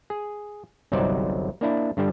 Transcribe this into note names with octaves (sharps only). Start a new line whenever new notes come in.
G#4
G1 C2 F#3 D#4 C5 D5
A#3 D4 E4
G2 D3 G3 D4